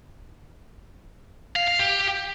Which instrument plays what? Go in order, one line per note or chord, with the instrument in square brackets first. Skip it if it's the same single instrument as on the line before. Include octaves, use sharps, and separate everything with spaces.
[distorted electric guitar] F5
F5
G4